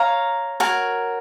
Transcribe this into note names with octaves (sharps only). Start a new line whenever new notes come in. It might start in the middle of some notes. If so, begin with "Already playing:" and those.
Already playing: C#5 F5 A#5
F#4 A#4 C#5